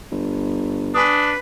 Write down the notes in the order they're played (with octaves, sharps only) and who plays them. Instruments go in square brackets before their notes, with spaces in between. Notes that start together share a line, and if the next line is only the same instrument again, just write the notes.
[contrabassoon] G1
[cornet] D4 [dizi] B4 [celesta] G#5 D#6